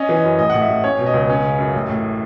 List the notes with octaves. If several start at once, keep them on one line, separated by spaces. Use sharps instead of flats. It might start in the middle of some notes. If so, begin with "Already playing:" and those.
Already playing: C#4 D#5
E3
D#5
F#2
A1 D#5
A2 F#5
E5
A1
C#4 C#5
B2
D#5
C#2
C#4
C#3
F#2
A1
A2